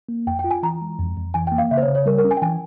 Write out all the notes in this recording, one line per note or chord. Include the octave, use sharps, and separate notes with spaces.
A#3
F2 G5
G5
F4
G#5
E3 A#5
G#3
F2
F2
E3 G#5
A#3 G5
F5
C#3 E5
C5
C#5
C#3
C#5
G3 A#4
A#4
C#4
G#5
G5
E3 G#5